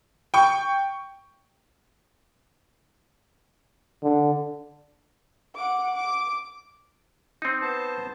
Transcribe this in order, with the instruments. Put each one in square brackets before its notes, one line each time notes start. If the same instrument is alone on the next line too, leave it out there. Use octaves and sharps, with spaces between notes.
[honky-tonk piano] G5 C#6
[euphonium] D3
[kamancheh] F#5 D6
D6
[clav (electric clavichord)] C4 D#4
[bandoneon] B3 C5 A5